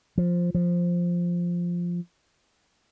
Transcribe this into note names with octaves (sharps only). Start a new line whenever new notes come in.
F3
F3